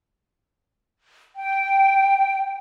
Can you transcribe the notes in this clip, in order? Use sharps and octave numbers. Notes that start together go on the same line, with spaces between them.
G5